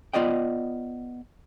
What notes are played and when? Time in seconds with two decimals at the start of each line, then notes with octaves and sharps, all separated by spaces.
0.13 B3 F4 D5 D#5 G5